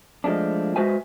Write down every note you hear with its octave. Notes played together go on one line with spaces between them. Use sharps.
F3 G#3 A3 D4
G#3 F#4 B4 C5 E5 G#5